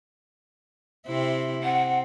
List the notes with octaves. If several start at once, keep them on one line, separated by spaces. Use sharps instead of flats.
C3 C4 E4
C4 F#5